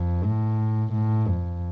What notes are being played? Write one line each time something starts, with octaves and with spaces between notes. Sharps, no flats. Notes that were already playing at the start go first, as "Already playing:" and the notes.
Already playing: F2
A2
A2
F2